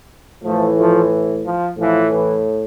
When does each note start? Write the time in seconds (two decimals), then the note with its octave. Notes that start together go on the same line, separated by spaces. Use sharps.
0.43 A2 E3 F3 A3
0.77 F3 A3
1.44 F3
1.77 A2 E3 F3
2.11 E3